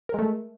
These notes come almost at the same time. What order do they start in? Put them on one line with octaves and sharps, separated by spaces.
A#4 G#3 A3